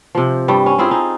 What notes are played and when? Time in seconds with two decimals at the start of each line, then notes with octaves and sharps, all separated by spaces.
0.15 C3 F3
0.48 G2 G3
0.66 C#4
0.79 C4 E4 F4 G#4
0.91 D#4